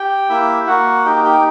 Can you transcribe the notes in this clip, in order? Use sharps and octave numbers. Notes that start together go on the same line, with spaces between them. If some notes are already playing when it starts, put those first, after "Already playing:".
Already playing: G4 G5
A#3 E4 E5
A#3 F#4 F#5
D#4 G4 G5
G4 G5